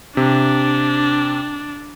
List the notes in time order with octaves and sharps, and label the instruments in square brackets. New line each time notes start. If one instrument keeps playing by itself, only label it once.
[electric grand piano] C3 [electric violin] D4